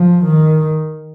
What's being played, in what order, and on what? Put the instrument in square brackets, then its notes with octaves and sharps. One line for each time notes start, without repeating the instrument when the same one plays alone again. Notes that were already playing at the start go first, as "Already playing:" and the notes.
Already playing: [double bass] F3
D#3